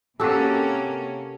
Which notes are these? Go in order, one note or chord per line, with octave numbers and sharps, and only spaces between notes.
C3 A#3 C#4 F#4 G4 A4